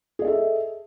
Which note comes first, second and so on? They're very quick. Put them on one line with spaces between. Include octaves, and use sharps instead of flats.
G#4 D#5 A4 E5